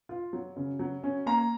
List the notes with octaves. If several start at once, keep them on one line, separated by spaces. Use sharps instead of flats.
F4
F#3
C#3
F#3
C#4
A#3 A#5